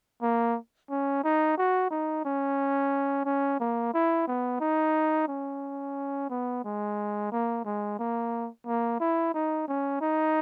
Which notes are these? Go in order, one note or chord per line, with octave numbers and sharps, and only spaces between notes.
A#3
C#4
D#4
F#4
D#4
C#4
C#4
A#3
E4
B3
D#4
C#4
B3
G#3
A#3
G#3
A#3
A#3
E4
D#4
C#4
D#4